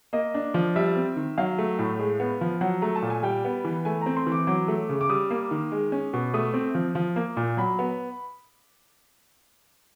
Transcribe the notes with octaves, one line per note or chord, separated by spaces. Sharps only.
A#3 D#5
D4
F3
G3 E5
C4
D#3
F#3 F5
A3
A2
G#3
B3
F3
F#3 F#5
A3 A#5
A5
A#2
G#5
G3 G5
B3
E3
A3 G#5
C4 A#5
C6
E3
D6
F#3 D6
A3
C#3
D6
G3 D#6
A#3
D#3
G#3
C#4
B2
A3 D#6
C4
F3
F3
A#3
A#2
F#3 B5
B3